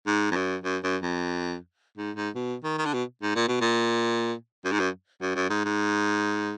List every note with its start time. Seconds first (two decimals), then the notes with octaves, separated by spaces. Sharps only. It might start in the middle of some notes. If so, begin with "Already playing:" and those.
0.07 G#2
0.31 F2
0.36 F#2
0.64 F#2
0.84 F#2
1.02 F2
1.98 G#2
2.16 G#2
2.35 B2
2.64 D#3
2.78 D#3
2.85 D3
2.93 B2
3.22 G#2
3.36 A#2
3.48 B2
3.61 A#2
4.65 F#2
4.72 G#2
4.80 F#2
5.22 F#2
5.35 F#2
5.50 G#2
5.65 G#2